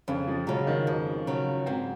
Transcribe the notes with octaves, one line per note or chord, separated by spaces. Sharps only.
F2 C#3
F3
C#3 F#3 G#3
D#3
F2
C#3 F#3
G#2 C4